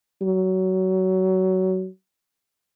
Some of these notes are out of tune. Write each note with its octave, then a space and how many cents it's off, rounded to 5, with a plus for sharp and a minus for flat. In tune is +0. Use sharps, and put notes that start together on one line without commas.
F#3 +20